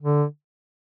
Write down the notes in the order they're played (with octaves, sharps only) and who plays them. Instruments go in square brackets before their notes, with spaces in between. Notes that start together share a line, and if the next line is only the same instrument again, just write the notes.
[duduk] D3